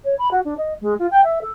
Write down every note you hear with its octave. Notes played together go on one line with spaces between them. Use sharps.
C#5
B5
F#4
D4
D#5
G#3
F4
G5
E5
A4